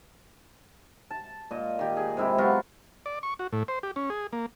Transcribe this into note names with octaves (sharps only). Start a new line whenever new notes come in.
A5
A#2 D#5
D#3 G4
G#4
C3 G#3 E4 G4
F#3 B3 F4
D5
C#6
F#4
A2
C5
G4
C#4
G#4
A#3